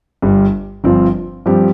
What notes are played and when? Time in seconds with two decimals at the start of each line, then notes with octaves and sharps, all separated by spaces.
0.22 G1 G2 G3
0.84 G1 G2 F3 C4 F4
1.46 G2 F3 C4 G4